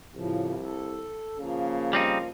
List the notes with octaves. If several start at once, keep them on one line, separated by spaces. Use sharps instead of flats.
C2 A2 C#3 F3
A4
C#3 F3 A#3
G3 C4 D#4